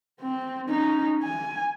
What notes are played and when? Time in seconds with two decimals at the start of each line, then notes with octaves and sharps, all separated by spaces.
0.21 C4
0.69 C#4 D#4
1.23 G#5